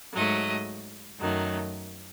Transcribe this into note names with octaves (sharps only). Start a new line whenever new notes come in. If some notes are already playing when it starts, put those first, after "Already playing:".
G#2 F#3 A3 D#5
F#2 D#3 F#3 A3